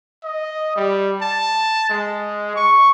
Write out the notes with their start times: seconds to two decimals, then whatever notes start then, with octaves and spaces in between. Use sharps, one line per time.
0.23 D#5
0.76 G3
1.22 A5
1.89 G#3
2.55 C#6